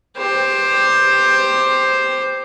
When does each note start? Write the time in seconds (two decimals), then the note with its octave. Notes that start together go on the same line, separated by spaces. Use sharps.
0.17 G4 C5